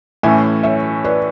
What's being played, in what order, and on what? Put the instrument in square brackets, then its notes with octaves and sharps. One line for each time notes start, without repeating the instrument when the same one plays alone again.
[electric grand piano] A2 E3 A3 C#4 [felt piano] E5 G#5
[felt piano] C#5 E5
B4 D5